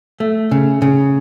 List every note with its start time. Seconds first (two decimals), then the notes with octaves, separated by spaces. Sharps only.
0.20 A3
0.51 C#3
0.82 C#3